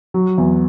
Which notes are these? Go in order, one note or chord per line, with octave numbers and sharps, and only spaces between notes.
F#3
E2